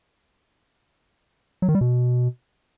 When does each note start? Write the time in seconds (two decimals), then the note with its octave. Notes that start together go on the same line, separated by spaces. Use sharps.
1.62 F#3
1.69 D#3
1.75 G3
1.81 B2